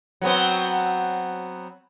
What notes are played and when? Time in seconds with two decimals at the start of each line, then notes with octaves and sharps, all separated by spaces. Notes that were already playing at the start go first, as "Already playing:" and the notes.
0.21 F#3 B3 C4